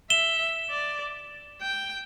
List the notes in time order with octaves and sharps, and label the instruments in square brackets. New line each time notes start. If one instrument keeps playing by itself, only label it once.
[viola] E5 [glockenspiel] E7 G7
[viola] D5
G5